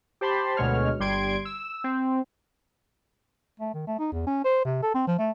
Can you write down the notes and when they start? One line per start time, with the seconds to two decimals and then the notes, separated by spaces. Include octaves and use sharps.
0.21 G4 C5 A5 B5 C6
0.57 D2 B2 G#3 C#5 F6
1.00 G1 G3 C6 G#6 D7
1.45 E6
1.84 C4
3.60 A3
3.74 D#3
3.87 A3
3.99 D#4
4.12 E2
4.26 C#4
4.44 C5
4.65 C3
4.83 A4
4.94 C4
5.07 F3
5.19 A3